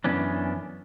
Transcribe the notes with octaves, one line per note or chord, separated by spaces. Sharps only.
F#2 E3 B3 C#4 D4